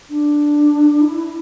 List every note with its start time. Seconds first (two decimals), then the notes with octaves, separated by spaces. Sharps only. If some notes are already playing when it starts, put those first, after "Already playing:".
0.10 D4
1.01 E4